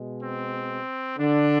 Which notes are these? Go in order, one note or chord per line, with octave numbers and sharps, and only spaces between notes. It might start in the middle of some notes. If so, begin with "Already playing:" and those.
Already playing: B2 G#3
C4
D3 D4